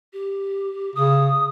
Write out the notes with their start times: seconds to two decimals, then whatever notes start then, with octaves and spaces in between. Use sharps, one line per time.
0.13 G4
0.95 C#3 D#6